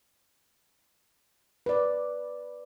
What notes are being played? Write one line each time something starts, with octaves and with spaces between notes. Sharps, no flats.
B4 D5